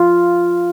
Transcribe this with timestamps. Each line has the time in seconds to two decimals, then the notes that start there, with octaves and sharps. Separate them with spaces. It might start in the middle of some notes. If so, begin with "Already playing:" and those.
Already playing: F4